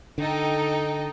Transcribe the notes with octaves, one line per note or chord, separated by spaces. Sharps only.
D3 D#4 A4 G5